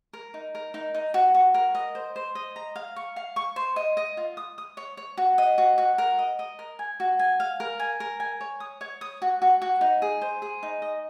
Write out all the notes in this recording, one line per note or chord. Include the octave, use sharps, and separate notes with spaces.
A#4
D#4
A#4
D#4
D#4
F#4
F#4
A#4
D#5
C5
C5
D#5
A#5
F5
C#6
F5
C#6
C5
D#5
D#5
F4
D#6
D#6
C#5
C#5
F#4
D#5
F#4
F#4
A#4
D#5
D#5
A#4
G#5
F#4
G#5
F5
A#4
G#5
A#4
G#5
C#5
D#6
C#5
D#6
F#4
F#4
F#4
D#4
G#4
C5
G#4
D#4
D#5